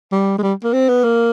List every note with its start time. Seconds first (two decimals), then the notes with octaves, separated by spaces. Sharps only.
0.12 G3
0.38 G#3
0.43 G3
0.64 A#3
0.73 C4
0.89 B3
1.04 A#3